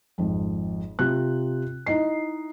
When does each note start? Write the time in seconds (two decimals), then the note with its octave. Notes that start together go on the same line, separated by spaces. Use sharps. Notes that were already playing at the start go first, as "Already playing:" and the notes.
0.18 G#1 F2
0.99 C3 F4 F#6
1.87 D#4 E4 D#5 C7